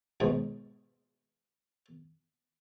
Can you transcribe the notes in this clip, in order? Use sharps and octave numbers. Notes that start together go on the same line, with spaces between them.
D#2 G#2 B2